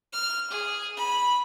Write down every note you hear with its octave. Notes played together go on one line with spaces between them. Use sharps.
F6
G#4
B5